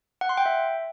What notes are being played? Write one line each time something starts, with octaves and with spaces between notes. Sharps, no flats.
F#5
C6
G5
E5